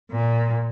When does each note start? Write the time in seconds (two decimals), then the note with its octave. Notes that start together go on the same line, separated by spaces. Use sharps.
0.11 A#2